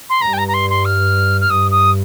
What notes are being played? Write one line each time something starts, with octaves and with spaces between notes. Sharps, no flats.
C6
G2 A#5
G5
A#5
A#5
C6
C6
F6
F6
G2 D#6
D#6